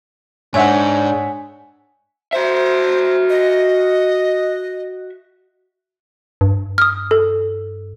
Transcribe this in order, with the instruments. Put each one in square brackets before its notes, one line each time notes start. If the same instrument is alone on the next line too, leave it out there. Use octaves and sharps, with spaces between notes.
[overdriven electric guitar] G#2 G#3 [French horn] D4 [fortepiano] C#5 E5 F#5 [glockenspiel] G#5
[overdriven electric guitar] F#4 E5 [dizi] C5
[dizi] D#5
[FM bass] G2
[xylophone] D#6 F6
A4